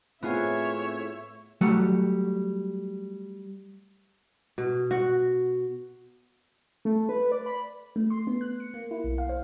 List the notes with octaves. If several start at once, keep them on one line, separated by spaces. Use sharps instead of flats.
A2 B3 C4 F4 G#4 C#5 E5
F#3 G3 A3 F#5
B2
F#4
A3
B4
D5
B5
A3
C6
B3
F#6
C#7
A#3
E4
B1
F5
C5